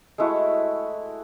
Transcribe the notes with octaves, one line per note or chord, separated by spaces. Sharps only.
G#3 A3 E4 F#4